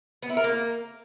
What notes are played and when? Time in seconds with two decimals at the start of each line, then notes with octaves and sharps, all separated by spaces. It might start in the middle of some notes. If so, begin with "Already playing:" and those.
0.22 B3
0.30 E4
0.37 A#4
0.44 A#3